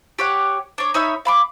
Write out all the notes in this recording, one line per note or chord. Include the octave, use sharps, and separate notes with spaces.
G4 C#5 F#5
D4 C#5
D#4 C#5 E5 B5
F5 B5 D6